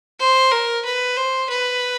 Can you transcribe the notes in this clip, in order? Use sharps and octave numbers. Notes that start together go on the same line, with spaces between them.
C5
A#4
B4
C5
B4